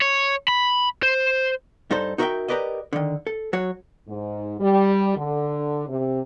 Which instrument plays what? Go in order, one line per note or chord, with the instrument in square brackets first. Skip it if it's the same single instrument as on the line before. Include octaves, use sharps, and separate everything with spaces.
[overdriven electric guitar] C#5
B5
C5
[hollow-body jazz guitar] G2 D#4 A4 C5
D#4 F#4 A#4 C#5 E5 G5
G4 A#4 B4 D5 D#5
D3 D#3
A4
F#3 F#4 C#5
[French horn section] G#2
G3
D3
C3